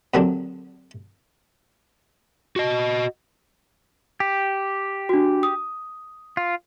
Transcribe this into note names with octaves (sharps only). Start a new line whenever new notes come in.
D#2 A#2 D3 F#3 C4 D4
F#4 D#5
G4
D4 F#4
D#6
F4